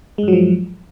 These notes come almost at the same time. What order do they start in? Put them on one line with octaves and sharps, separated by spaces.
G#3 G2 F#3 F3